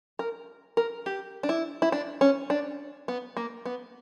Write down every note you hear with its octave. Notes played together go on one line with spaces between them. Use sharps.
A#4
A#4
G4
D4
E4
E4
D4
C#4
D4
B3
A#3
B3